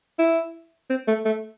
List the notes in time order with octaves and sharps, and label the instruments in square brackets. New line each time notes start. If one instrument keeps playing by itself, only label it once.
[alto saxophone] E4
C4
A3
A3